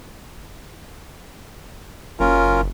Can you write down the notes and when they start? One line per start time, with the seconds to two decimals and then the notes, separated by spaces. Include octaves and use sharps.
2.20 F#1 C#4 F4 A#4